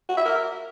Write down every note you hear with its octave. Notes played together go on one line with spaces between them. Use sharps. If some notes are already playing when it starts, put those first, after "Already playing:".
F#4
E5
A#4